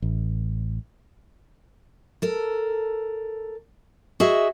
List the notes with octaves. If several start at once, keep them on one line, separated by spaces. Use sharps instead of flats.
A1
A4 A#4
F#4 G#4 D#5 E5